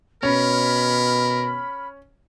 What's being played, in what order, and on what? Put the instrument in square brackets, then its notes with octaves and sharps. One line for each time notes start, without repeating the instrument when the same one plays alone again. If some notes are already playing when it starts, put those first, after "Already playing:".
[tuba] B2 [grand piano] C#4 [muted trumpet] A#4 [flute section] B5 F6